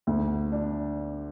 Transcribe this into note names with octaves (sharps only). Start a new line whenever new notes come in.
D2
D4